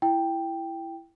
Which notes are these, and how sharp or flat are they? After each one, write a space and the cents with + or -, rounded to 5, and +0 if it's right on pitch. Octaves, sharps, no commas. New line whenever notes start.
E4 +15 G5 +0